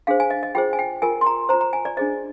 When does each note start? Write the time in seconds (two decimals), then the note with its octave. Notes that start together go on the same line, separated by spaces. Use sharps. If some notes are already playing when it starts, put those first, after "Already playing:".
0.07 D4 G#4 C5 F5
0.20 G#5
0.30 D#5
0.43 D#5
0.55 F4 G#4 C5 G5
0.73 G#5
0.79 G5
1.02 F4 A#4 G#5
1.21 C6
1.26 A#5
1.49 C5 A#5
1.53 F4
1.61 A#5
1.73 G#5
1.85 D5
1.97 D4 G#4 C5 D#5